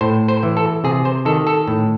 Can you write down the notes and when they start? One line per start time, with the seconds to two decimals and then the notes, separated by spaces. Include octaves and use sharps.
0.01 A2 C5
0.28 C5
0.43 E3
0.57 A4
0.84 C3 G#4
1.05 C5
1.25 D#3 A4
1.47 A4
1.68 A2